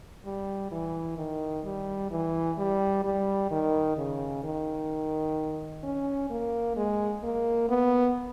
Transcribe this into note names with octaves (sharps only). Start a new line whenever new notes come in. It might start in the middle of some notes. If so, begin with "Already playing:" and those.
G3
E3
D#3
G3
E3
G3
G3
D#3
C#3
D#3
C#4
A#3
G#3
A#3
B3